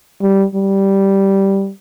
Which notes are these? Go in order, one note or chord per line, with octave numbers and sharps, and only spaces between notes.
G3
G3